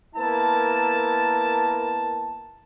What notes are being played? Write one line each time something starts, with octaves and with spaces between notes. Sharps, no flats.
A#3 B3 E4 A#4 A5